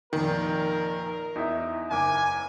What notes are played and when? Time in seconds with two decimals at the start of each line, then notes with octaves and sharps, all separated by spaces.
0.13 F1 A#2 D#3 A#3 A#4
1.36 E2 D#4 E4 E5
1.91 F#1 G#5 D6